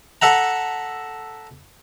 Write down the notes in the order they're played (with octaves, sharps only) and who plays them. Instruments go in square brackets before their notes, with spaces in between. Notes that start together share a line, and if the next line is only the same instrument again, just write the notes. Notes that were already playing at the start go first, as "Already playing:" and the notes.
[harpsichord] A4 E5 F#5 A#5